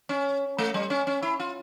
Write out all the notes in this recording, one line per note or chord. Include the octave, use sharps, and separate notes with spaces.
C#4
A3
G3
C#4
C#4
E4
F4